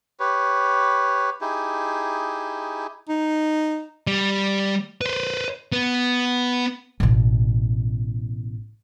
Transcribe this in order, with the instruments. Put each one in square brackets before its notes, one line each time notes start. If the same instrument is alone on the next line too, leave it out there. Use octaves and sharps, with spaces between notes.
[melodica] G4 B4 C#5
D#4 E4 G4 G#4
[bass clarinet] D#4
[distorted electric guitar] G3
B4 C5
B3
[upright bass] A1 B2